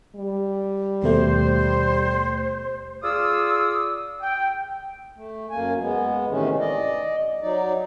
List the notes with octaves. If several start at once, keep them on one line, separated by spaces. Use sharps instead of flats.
G3
D#2 B2 A3 C5
F4 G#4 D5 F5 D#6 E6
G5
A3
F#2 A#3 G#5
G#3 B3
A2 C3 D#3 E3 A3 C#4
D5 D#5
F#3 D#4 D5